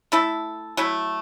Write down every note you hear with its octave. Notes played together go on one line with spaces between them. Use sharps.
A3 E4 A4
F#3 A3 E4